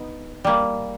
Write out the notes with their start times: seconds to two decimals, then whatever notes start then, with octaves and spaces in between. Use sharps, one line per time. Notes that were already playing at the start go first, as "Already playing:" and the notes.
Already playing: B3 D#4
0.44 G3 A#3